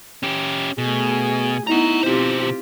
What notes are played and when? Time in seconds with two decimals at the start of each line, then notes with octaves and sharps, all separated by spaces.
0.23 C#4 G4
0.78 B2 A3 G#4
1.67 B3 D#4 E4 F#5 A#5
2.03 B2 C4 F4 G4 C5